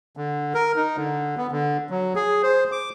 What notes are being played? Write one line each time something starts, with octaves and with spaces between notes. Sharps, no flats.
D3
A#4
D#4
D3
B3
D3
F#3
G#4
C5
D6